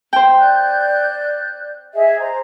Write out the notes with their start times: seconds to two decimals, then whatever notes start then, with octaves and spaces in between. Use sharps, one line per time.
0.13 C5 G5
0.38 D5 F#6 G6
1.94 G#4 D#5 E5
2.20 C5 A#5